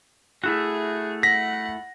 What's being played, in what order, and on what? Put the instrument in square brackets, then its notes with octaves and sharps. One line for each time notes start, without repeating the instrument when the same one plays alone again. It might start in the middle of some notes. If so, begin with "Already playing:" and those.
[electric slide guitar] A3 E4 F#4 [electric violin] G#4
[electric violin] F#5 [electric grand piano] A#6 [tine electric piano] B6